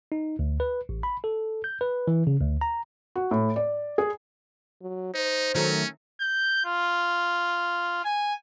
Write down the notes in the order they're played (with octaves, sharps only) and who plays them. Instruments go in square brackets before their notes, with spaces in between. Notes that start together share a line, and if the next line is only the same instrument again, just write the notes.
[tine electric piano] D#4
D2
B4
A1
B5
A4
G6
B4
E3
C#3
D2
A#5
[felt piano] F#4
A2
D5
G#4
[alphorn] F#3
[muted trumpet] D#4 [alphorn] C5
[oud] D#3 F#3 A3 [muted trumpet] C#4
[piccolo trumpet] G6
F4
G#5